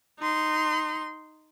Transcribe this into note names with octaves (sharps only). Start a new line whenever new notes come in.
D#4 C6